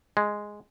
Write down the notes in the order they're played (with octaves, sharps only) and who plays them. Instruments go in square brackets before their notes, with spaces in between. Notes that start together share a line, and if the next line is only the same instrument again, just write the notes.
[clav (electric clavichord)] G#3